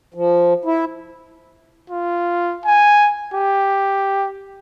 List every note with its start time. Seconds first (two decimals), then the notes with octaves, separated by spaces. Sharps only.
0.14 F3
0.65 E4
1.90 F4
2.65 G#5
3.34 G4